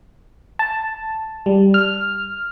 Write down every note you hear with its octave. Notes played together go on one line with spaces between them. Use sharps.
A5
G3
F6